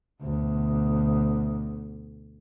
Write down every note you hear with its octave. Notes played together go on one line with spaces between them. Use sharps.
D2 B2